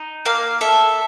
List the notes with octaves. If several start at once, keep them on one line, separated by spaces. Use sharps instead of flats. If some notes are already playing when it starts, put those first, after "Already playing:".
Already playing: D#4
A#3 F5
A4 E5